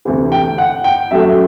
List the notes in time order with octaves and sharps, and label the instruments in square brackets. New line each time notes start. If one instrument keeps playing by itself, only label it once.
[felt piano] D2 C3 E3
[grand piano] G5
F#5
G5
[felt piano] F#2 F#3 A3 [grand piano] E5